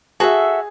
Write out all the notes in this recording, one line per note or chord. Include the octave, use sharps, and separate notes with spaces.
F#4 G#4 A4 E5